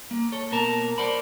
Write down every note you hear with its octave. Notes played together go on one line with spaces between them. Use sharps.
A#3
A4 C#5
B2 A#3 A#4 A5 A#5
A#4 C5 D5 F#5 B5